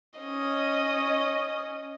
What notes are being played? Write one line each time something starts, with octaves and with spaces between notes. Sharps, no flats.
C#4 D#5